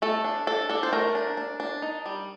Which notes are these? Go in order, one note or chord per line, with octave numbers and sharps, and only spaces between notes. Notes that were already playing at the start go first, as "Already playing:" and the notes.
A3 A4
D4
D4 A4
D4 A4
C5
A3 A#4
D4
D4
D4
D#4
G3